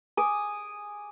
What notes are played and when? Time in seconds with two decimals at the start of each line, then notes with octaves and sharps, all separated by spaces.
0.17 G#5 D6 D#6